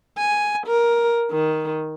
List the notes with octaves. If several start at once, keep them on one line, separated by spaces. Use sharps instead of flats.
G#5
A#4
D#3